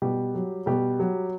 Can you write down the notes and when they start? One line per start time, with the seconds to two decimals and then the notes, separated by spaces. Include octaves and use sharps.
0.02 B2 G3 G4
0.35 F#3
0.66 B2 G3 G4
0.99 F#3